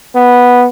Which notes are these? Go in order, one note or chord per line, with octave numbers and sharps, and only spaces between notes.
B3